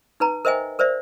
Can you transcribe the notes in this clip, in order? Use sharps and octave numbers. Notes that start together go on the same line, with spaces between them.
D#4 B4 A#5
A#4 C5 D#5 E5 G5 G#5
A#4 C5 D5 E5